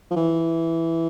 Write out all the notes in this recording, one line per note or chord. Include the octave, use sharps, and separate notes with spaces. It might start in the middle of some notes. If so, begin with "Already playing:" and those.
F3
E3